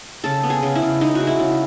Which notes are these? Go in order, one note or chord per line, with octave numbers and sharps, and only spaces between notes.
C#3 A4
B3
G#4
C#3
E4
C#3
G#3 D#4
F#4
G#3
E4
C#3